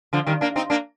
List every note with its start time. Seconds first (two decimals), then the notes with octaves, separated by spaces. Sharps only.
0.13 D3 F3
0.27 D#3 G3
0.41 A#3 D4
0.56 C4 D#4
0.70 A#3 D4